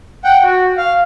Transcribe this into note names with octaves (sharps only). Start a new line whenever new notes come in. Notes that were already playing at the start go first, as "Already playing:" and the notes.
F#5 G5
F#4
F5